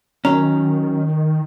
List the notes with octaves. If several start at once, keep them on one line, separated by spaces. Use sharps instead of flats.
D#3 F#3 C#4 A#5